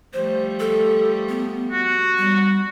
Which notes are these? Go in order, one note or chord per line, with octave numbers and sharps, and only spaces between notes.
F3 G3 A3 C5
A4
B3
F#4
G3